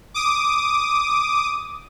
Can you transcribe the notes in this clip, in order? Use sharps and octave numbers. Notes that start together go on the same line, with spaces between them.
D6 D#6